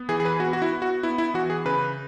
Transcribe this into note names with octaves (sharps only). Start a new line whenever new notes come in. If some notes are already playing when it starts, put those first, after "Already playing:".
Already playing: B3
E3 G#4
G#4
B4
B3 F#4
F#4
E4
B3
F#4
B3 E4
E4
E3 F#4
G#4
C#3 B4